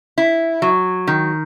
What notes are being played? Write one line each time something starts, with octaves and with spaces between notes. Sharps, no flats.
E4
F#3
D#3